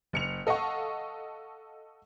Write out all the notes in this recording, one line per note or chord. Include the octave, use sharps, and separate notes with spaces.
F#1 C#7 F7
A4 D#5 F5 F#5 C#6